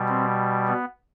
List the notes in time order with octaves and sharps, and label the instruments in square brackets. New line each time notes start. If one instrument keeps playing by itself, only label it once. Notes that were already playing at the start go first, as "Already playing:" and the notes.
Already playing: [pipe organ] B2 G3
C4
B3